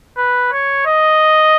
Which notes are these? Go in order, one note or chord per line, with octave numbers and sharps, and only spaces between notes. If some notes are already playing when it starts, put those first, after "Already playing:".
B4
C#5
D#5